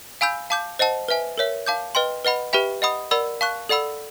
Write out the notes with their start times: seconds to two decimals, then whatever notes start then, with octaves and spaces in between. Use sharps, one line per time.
0.21 F5 G#5 B5 E6 G6
0.50 F5 A5 D6 G6
0.79 C5 D#5 F#5 A5
1.08 B4 E5 G#5
1.38 A#4 C#5 E5
1.66 F5 A5 D6 G6
1.95 B4 D#5 G5 C6
2.25 B4 D#5 F#5 B5
2.53 G4 B4 E5 G5 B5
2.82 D#5 F#5 B5 D#6
3.11 A#4 D5 F#5 B5 E6
3.41 F5 A5 C#6 F#6
3.69 A4 D5 F#5 B5 E6